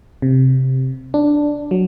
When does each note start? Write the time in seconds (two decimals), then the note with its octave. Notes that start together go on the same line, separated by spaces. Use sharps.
0.22 C3
1.14 D4
1.71 F#3